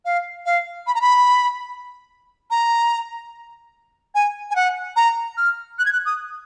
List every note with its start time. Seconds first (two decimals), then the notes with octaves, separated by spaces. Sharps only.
0.05 F5
0.46 F5
0.87 B5
0.95 A#5
1.01 B5
2.51 A#5
4.15 G#5
4.50 G#5
4.56 F#5
4.96 A#5
5.37 F6
5.79 F#6
5.86 G#6
5.93 F#6
6.05 D#6